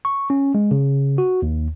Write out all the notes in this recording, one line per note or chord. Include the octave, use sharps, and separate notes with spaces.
C#6
C#4
G#3
C#3
F#4
D#2